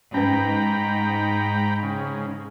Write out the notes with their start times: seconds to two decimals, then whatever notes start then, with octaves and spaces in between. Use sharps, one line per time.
0.14 G#2 C#4 B4 G5 A#5 B5
1.83 C#3